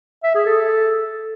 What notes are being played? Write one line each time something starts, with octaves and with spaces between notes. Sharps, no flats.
E5
G#4
A4